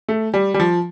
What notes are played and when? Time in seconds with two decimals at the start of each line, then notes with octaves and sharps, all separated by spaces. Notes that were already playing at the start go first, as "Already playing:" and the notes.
0.09 A3
0.34 G3
0.54 G3
0.60 F3